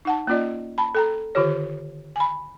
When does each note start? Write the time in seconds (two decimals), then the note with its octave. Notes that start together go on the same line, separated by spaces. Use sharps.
0.05 D#4 F#5 A5
0.27 A#3 C#4 F4 D5 D#5
0.78 G5 A5 B5
0.95 A4 G5 A#5
1.35 D3 D#3 F4 G4 C#5
2.16 G#5 B5